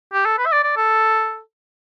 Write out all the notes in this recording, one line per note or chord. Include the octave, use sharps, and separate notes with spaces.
G4
A4
B4
E5
D5
D5
A4